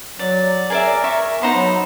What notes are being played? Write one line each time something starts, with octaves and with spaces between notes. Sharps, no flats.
F#3 D5
G#4 A#4 D5 E5
E5 C#6
B3 D#4 C5 B5
F#3